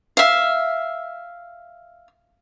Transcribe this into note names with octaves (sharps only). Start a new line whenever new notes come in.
E5 F5